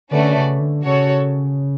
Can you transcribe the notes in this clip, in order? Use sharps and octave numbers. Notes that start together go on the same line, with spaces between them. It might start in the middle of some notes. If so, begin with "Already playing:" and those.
D3 A3 C#4 F#4 B4 D5
C#3
D3
C#3 F#4 A4 C#5